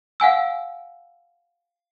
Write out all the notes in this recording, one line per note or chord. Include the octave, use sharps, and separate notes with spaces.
F5 F#5 G#5 E6